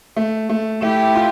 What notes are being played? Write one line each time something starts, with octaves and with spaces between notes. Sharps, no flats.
A3
A3
A3 E4 G4
F4